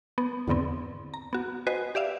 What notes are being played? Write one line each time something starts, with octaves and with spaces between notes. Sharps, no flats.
B3
E2 G#2 D3 B3 C4
A#5
B3 F#4
F#4 B4 C5 D#5 G#5
G4 D5 E5 F5